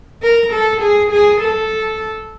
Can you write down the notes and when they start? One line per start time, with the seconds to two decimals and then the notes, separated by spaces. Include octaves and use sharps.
0.23 A#4
0.53 A4
0.81 G#4
1.11 G#4
1.41 A4